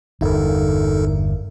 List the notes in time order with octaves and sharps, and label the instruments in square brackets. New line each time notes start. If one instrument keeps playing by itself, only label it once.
[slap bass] G1 E2 [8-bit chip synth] D#4 A4 A#4